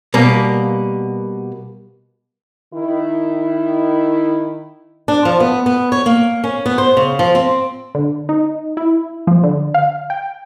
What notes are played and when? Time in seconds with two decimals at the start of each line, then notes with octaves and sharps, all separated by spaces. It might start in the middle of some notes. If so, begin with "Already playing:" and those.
0.14 B2 G3 A#3
2.74 D#3 E4
5.08 D4
5.25 F3
5.40 B3
5.66 B3
5.92 C#5
6.06 A#3
6.44 C#4
6.66 B3
6.78 C5
6.97 C#3
7.19 F3
7.35 C4
7.95 D3
8.29 D#4
8.77 E4
9.27 F3
9.43 D3
9.74 F5
10.10 G5